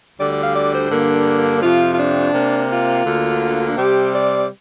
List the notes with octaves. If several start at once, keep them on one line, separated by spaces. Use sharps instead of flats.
D2 D3 G3 D5
D5
F5
D5
C5
G2 D3 A#3
F2 C3 F3 F4
F4
D4
C3 A#3
F4
D2 D3 A#3
C3 G3 C4 G4
D5